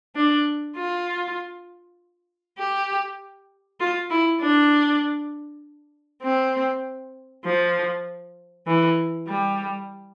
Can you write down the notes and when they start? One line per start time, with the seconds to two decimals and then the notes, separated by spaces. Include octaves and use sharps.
0.15 D4
0.76 F4
2.59 G4
3.80 F4
4.11 E4
4.41 D4
6.23 C4
7.45 F3
8.67 E3
9.28 G3